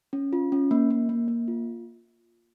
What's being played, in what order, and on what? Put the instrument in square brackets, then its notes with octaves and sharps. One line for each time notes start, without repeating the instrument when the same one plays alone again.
[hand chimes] C#4
F4
C#4
A#3
A#3
A#3
A#3
F4